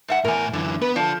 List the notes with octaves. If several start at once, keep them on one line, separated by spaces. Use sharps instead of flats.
G#2 E5 F#5
E2 A2 A#4 G#5
F#2 D3 E3
B3 B4
F3 D4 A4